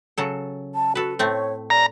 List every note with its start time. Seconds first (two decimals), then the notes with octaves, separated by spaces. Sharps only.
0.18 C#3 F#3 A4
0.75 A5
0.95 F#4 A4 B4
1.19 A2 A3 C4 C#5
1.70 D5 A#5